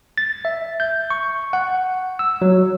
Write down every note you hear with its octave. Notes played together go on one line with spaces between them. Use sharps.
A6
E5
G6
C#6
F#5
E6
F#3